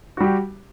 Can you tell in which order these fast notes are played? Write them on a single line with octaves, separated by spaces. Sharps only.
F#4 G3 G4